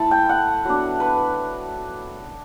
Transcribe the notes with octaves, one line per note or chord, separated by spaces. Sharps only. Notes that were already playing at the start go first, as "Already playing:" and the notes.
Already playing: A3 E4 A5 B5
G5
F#5
F#3 B3 D4
B4